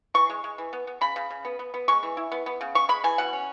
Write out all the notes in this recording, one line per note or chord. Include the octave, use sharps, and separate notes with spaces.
E3 C#6
G#3
G#3
E3
B3
B3
C#3 B5
C#3
C#3
B3
B3
B3
G#3 C#6
E3
E4
B3
B3
C#3
G#3 C#6
G#3 B5
E3 G#5
B2 F#5
C#4